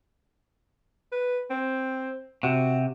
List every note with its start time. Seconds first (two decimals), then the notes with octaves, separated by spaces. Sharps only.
1.12 B4
1.50 C4
2.43 C3 F#4